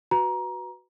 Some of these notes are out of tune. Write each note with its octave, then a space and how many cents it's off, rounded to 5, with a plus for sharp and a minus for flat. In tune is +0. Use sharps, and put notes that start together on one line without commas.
F#4 +0 B4 +0 A#5 +20